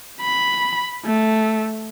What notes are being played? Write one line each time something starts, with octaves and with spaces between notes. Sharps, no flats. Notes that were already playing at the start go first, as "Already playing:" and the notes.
B5
A3